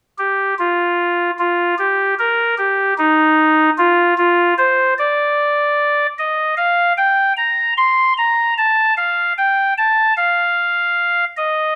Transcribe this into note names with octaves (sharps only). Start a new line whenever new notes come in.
G4
F4
F4
G4
A#4
G4
D#4
F4
F4
C5
D5
D#5
F5
G5
A#5
C6
A#5
A5
F5
G5
A5
F5
D#5